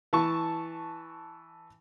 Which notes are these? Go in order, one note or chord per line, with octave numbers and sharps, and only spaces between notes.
E3 A5 C#6